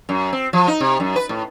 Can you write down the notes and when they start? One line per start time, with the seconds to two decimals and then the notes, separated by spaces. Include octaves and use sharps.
0.09 F#2
0.33 C4
0.53 F3
0.68 D#4
0.80 C3
1.00 F#2
1.16 B4
1.29 A2